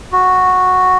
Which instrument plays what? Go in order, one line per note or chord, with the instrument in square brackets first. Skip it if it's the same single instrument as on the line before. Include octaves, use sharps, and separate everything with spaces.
[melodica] F#4